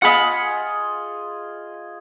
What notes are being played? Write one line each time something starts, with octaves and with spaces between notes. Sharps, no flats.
F4 G#4 D#5 F#5 B5